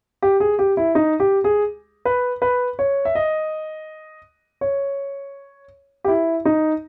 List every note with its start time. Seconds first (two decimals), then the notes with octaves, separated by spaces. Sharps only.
0.22 G4
0.40 G#4
0.59 G4
0.77 E4
0.95 D#4
1.20 G4
1.44 G#4
2.05 B4
2.42 B4
2.79 C#5
3.05 E5
3.15 D#5
4.61 C#5
6.04 G4
6.08 E4
6.45 D#4